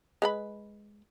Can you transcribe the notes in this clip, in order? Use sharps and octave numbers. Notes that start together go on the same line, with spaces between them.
G#3 B4 B5